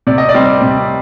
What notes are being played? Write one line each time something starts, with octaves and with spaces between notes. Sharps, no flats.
C3 D5
D#5
D5
G3 C4
C3